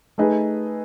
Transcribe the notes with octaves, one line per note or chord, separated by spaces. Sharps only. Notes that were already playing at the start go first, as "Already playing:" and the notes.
A3 D#4 G#4 B4 D#5